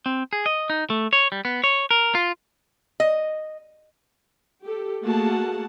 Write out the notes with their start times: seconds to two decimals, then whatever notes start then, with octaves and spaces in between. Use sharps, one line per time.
0.06 C4
0.33 G#4
0.46 D#5
0.70 D#4
0.90 A3
1.13 C#5
1.32 G3
1.45 B3
1.64 C#5
1.91 A#4
2.15 F4
3.00 D#5
4.64 G4 A4
5.02 A3 A#3 F#4 G#4 F#5 A5